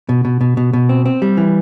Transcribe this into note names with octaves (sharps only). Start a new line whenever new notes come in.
B2
B2
B2
B2
B2
C4
C4
G3
E3